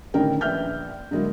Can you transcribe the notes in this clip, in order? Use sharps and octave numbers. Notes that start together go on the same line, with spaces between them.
A1 D3 D#3 C#4 A#4 G5
A#1 B4 E5 F6 G6
D3 F#3 G#3 A#3 E4